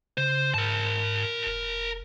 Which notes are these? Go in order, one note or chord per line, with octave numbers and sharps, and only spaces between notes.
C#3 C5
G#2 A#4 A5
F1